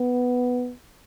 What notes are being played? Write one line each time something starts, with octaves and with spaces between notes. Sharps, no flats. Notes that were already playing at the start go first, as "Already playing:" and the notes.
Already playing: B3